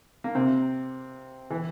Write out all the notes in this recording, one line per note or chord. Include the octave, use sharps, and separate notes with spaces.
A#3
C3 C4
E3